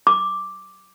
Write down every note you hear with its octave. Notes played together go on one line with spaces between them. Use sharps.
D6